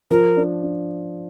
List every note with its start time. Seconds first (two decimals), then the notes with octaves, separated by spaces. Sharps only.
0.11 F3 A#4
0.37 D4
0.63 D4